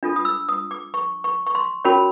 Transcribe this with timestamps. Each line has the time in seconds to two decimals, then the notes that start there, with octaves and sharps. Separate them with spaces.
0.03 D4 F4 A4
0.16 D#6
0.25 E6
0.49 D#6
0.71 D6
0.94 C#6
1.24 C#6
1.47 C#6
1.55 C6
1.85 C#4 F#4 A#4 C#5 B5